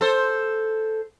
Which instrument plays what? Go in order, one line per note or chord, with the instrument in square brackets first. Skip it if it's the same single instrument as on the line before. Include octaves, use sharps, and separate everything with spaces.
[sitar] A4 C5